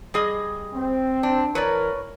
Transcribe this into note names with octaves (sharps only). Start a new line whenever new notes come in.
G3 G#4 D#5
C4
D4
E3 A#4 B4 C#5 D5